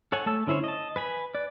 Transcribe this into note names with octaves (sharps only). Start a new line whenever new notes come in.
A4 C#5 F#5 G#5
A3 A4 A5 E6
D3 C#4 E4 C5 C#5
D#5 A5
B4 G#5 B5
B4 D5